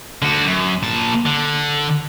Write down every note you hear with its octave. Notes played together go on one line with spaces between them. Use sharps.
D3 F#4
F#2
A#2 A5
D3